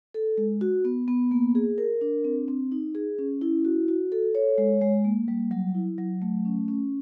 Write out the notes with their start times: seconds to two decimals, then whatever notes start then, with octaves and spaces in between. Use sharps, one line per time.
0.14 A4
0.38 G#3
0.61 F#4
0.85 B3
1.08 B3
1.31 A#3
1.55 G#4
1.78 A#4
2.01 D4
2.24 C4
2.48 C4
2.72 D#4
2.95 G#4
3.19 C#4
3.41 E4
3.65 F#4
3.88 F#4
4.12 A4
4.35 C#5
4.58 G#3
4.81 G#3
5.05 A#3
5.28 G3
5.51 F#3
5.75 E4
5.98 F#3
6.22 A3
6.45 C#4
6.68 C#4